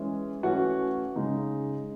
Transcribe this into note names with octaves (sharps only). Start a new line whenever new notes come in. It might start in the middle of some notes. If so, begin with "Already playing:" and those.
Already playing: E3 G#3 C#4
E3 A3 C#4 F#4
C#3 G#3 D#4